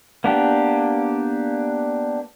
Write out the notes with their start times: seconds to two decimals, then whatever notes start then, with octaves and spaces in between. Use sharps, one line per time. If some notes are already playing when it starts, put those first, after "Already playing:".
0.24 A#3 B3 D4 G4